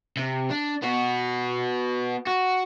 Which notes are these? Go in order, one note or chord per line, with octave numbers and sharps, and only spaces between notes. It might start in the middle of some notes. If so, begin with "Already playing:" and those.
C3
D4
B3 F#4
F#4